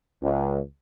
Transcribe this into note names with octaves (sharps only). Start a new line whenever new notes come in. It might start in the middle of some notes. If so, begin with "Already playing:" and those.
C#2